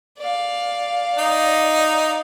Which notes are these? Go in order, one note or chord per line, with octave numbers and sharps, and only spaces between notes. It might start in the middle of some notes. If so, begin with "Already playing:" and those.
D5 F5
D#4